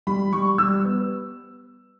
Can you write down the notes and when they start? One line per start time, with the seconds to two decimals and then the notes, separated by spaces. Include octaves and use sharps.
0.07 G3 B5
0.33 G3 C#6
0.58 G3 E6
0.84 B3